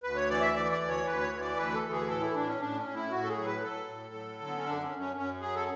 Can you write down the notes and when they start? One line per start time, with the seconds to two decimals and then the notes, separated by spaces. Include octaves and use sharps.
0.03 D2 B4
0.16 C#5
0.29 E3 D5
0.41 E5
0.55 E3 D5
0.72 D5
0.80 D2
0.88 C#5
1.06 D2 B4
1.22 C#5
1.32 E3
1.40 D5
1.57 D2 B4
1.74 A4
1.82 E3
1.91 G#4
2.08 A2 A4
2.21 E4
2.34 A2 D4
2.47 C#4
2.60 A2 D4
2.77 C#4
2.85 A2
2.94 E4
3.11 A2 F#4
3.23 A4
3.28 G#4
3.37 F#3
3.45 B4
3.62 F#3 A4
3.88 A2
4.14 F#3
4.39 D3
4.47 B3
4.56 C#4
4.65 F#2 D4
4.83 C#4
4.91 F#2
4.99 C#4
5.16 F#2 C#4
5.42 F#3 G#4
5.55 A4